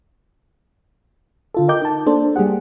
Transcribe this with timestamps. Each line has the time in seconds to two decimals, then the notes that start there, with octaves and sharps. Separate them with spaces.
1.54 D3 F4 A4
1.68 A#4 D#5 G5 D6 G6
1.82 D#4 A5
2.06 A#3 D4 A4 C5
2.36 G3 A#3 G4 G#4 F#5